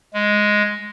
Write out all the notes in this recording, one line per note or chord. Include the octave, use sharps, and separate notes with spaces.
G#3